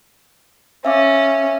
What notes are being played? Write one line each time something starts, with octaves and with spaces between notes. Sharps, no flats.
C#4 E5 F5 D6